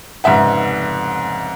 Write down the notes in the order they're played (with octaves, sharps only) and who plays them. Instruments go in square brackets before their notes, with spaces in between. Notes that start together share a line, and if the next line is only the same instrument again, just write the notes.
[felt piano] F1 G#2 C#3 E5 F#5